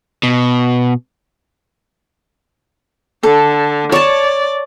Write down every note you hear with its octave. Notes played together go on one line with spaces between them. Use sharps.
B2
D3 A4
C#5 D5 A5